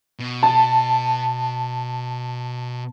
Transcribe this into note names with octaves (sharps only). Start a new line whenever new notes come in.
B2
A5